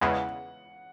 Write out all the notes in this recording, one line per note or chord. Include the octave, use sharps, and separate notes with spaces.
E2 C#3 E3 G#3 F#5